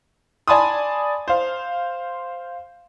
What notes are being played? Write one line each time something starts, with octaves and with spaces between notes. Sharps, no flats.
D5 G#5 A5 B5 C6 D#6
C5 F5